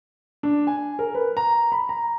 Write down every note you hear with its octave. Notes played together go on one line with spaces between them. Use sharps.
D4
G#5
A#4
B4
A#5
B5
A#5